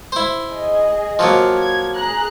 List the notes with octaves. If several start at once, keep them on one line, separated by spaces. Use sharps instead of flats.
E4 C5
G#4 D#5
F3 F#3 A#3
G#6
G#4 A#5 F#6